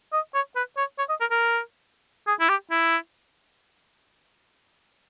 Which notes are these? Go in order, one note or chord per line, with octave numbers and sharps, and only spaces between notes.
D#5
C#5
B4
C#5
C#5
D#5
A#4
A#4
G#4
E4
G4
E4